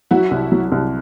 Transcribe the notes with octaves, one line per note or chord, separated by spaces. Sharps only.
F#3 E4 F#4
C2
F#3
C2